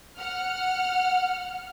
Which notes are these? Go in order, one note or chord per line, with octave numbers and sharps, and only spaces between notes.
F#5 F6